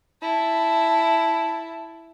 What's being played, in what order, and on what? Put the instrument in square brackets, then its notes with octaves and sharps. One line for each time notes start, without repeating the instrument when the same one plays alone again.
[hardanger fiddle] E4 A5